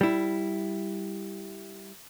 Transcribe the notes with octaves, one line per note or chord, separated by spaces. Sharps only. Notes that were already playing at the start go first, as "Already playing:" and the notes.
G3 E4